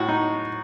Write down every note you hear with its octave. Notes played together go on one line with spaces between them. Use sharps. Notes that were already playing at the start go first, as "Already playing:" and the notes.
Already playing: A2 F#4
D#4